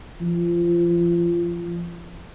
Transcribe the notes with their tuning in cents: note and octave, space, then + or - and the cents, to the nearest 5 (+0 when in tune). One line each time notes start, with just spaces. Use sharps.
F3 -25